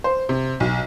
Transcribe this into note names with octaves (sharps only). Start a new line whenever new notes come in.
C5
C3
B1